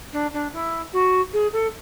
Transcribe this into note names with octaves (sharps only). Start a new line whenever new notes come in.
D4
D4
E4
F#4
G#4
A4